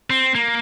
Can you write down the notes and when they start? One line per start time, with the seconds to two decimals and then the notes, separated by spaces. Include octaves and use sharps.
0.10 C4
0.35 A#3